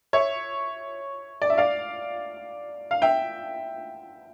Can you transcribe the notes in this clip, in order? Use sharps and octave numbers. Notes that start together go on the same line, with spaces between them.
C#5 E5
D5
E5
D5 F5
F5
E5 G5